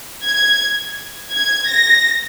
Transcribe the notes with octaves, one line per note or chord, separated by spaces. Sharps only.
G#6
G#6
A#6